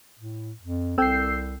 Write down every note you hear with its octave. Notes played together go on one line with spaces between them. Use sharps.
A2
F2
C2 C4 A4 G5 E6 G6 C7